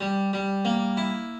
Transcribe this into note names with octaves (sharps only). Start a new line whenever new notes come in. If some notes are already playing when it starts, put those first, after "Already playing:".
G3
G3
A#3
E4